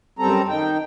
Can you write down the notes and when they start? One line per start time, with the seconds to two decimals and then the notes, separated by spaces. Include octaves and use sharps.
0.19 F#2 G3 C4 A4 A#5
0.49 D#3 D#4 G5